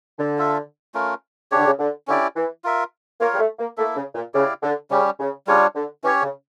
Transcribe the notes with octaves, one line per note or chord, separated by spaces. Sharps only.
D3
F4 A4 E5
A3 C#4 F4 A#4
C#3 D4 G4 C#5
D3
C#3
D3
D3 C#4 E4 G4 D5
E3
F4 A#4 E5
A#3 F4 A#4 C#5 F5
G3
A3
A#3
A3 A#3 E4 A4 E5
C#3
A#2
C#3 E4 G4 D5 F5
D3
C#3 G3 C#4 G4
C#3
C#3 G3 D4 F4 C#5
D3
E3 C#4 G4 C#5
C#3